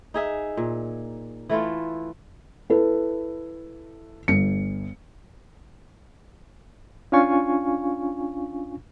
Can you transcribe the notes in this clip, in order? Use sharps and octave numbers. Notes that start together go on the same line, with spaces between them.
D#4 G#4 E5
A#2
E3 A3 E4 F4
E4 A4 B4
G1 C#7
C#4 D4 F4 F5 G#5 C#6